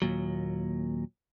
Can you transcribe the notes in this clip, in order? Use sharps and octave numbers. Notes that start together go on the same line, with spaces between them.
D#2 A#2 F#3